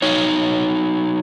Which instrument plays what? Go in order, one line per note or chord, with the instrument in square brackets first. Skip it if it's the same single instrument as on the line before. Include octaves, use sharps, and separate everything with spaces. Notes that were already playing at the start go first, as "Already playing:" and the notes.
[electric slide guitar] F#3 D#4 C#5